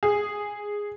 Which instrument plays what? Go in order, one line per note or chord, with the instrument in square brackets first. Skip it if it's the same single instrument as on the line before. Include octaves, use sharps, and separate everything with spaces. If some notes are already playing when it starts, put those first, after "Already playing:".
[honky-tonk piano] G#4